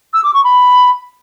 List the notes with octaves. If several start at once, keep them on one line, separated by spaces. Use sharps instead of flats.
E6
D6
C#6
B5